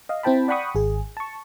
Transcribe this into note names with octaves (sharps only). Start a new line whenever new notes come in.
D#5 F5
C4 E4 C5 G5 A5 B5
D5 F#5 G5 B5 C#6 D#6
G#1 G#4
A5 C#6